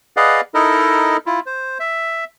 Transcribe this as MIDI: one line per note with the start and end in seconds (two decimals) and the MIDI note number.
0.17 0.41 68
0.17 0.41 71
0.17 0.41 74
0.17 0.41 75
0.17 0.41 77
0.17 0.41 78
0.54 1.17 63
0.54 1.17 64
0.54 1.17 69
0.54 1.17 70
0.54 1.17 75
1.26 1.40 64
1.26 1.40 65
1.46 1.78 72
1.80 2.24 76